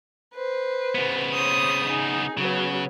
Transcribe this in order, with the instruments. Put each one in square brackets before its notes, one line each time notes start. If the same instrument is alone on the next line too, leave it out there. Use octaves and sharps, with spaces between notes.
[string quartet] B4 C5
[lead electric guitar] C#3 B3
[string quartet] C5 C#5 D#6
D#4 G#4
[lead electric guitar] C#3 [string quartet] F#3 B3